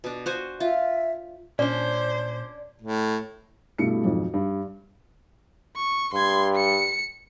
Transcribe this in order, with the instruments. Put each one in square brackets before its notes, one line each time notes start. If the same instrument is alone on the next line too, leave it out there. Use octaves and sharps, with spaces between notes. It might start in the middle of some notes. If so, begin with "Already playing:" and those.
[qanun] B2 D4
F#4 C5 G#5
[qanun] F4 [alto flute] E5
[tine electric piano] A#2 [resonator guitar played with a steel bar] C#4 D4 [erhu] C5 [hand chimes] D5
[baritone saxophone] A2
[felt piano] G2 B2 A3 E4 C#7
B1 F2 G#2
G2
[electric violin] C#6
[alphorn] G2 [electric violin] C6 G#6
[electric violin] C#7